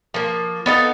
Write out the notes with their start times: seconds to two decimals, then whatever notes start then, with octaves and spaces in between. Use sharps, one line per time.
0.14 F3 A#3
0.66 B3 D#4 A4 F5